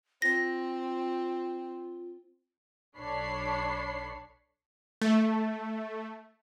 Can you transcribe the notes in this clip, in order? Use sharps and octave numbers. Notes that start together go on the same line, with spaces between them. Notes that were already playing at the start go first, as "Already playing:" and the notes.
C4 F4 A#6
B1 D4 A4 C#5 B5 C7
A3